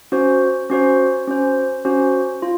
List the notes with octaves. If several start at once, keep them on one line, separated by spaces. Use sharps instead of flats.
C#4 F#4 C5
C#4 F#4 C5
C#4 F#4 C5
C#4 F#4 C5
F4